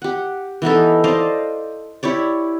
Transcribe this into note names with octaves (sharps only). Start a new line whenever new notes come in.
G4 F#5
E3 B3 D#4 A4
C5 D5 D#5 F5
E4 G4 C#5 D5